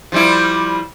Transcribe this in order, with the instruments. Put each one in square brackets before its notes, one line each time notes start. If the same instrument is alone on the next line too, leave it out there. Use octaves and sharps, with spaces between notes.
[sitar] F3 G3 E4